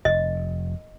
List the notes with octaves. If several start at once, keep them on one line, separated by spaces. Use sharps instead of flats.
F1 D#5